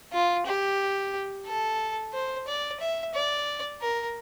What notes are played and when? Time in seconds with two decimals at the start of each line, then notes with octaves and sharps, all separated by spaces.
0.13 F4
0.46 G4
1.47 A4
2.13 C5
2.47 D5
2.80 E5
3.14 D5
3.82 A#4